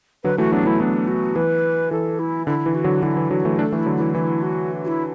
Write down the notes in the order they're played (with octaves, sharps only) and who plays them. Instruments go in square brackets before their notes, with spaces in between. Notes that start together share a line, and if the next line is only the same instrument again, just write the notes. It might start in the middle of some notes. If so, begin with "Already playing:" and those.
[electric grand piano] D3 F#3 [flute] B4
[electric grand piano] E3 A3 [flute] F#4
[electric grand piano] F#3 B3 [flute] D4
[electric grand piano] E3 A3 [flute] E4
[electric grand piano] F#3 B3 [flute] D4
[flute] F#4
[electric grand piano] E3 [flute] B4
[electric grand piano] E3 [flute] A4
[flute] E4
[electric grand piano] D3 [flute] E4
[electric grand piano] E3
[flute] F#4
[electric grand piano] D3 F#3
[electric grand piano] D3 F#3 [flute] E4
[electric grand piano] E3
[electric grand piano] D3 F#3 [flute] F#4
[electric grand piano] E3 A3
[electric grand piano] A3 D4 [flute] A4
[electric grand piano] E3 A3
[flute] E4
[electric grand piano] D3 F#3
[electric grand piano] E3 [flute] E4
[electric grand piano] E3 [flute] E4
[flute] F#4
F#4
E4